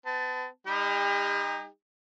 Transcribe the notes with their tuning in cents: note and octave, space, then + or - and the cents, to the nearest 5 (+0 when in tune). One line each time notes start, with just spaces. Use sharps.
B3 +40 A5 +0
G3 +40 D#4 +0 G4 +45